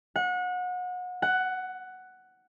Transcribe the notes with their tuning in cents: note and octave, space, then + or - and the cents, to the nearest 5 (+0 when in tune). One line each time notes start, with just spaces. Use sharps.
F#5 -30
F#5 +10